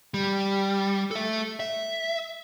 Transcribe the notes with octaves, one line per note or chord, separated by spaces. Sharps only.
G3
A4 E5
E5